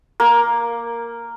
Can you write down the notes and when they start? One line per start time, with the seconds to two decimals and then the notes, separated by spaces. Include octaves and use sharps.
0.20 A#3